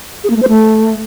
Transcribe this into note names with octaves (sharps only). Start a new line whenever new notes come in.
G#4
A#3
A3
C5
A3